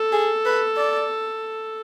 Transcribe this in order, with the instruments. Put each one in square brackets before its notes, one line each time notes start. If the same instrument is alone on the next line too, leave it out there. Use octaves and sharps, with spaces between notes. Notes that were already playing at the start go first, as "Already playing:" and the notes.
Already playing: [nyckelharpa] A4
[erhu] G#4
B4
D5